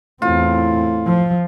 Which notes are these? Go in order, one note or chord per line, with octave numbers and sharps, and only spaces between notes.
E2 A2 C4 F4
F3